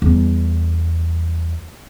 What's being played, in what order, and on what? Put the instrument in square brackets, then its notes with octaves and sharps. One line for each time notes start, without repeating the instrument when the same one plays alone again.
[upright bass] E2 G3